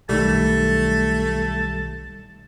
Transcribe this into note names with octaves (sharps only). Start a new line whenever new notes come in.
B1 D#3 G3 A3 A5